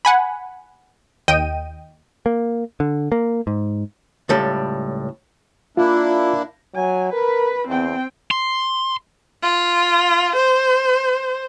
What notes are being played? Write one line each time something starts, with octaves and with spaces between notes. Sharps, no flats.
F#5 G#5 B5
D#2 D#5 G5 D#7
A#3
D3
A#3
G#2
C#2 A2 G3 A4
A#3 D4 E4 F4
F#3 G#5
A#4 B4
E2 C4 G5
C6
F4
C5